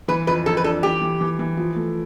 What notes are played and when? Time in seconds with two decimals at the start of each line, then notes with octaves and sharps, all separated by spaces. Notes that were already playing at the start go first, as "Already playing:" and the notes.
0.08 E3 B4
0.27 F2 B4
0.46 F2 A4
0.57 B4
0.64 D4 A4
0.83 E3 G4
1.01 E3
1.21 E3
1.39 E3
1.57 F3
1.76 A3